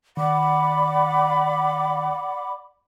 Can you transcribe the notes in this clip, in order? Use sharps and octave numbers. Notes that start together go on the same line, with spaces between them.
D#3 D5 F#5 B5 D6